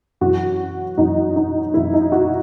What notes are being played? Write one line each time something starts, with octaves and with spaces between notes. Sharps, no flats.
F#2 E3 F#4
F#2 E3 D#4
D#4
F#2 E3 E4
D#4
F#4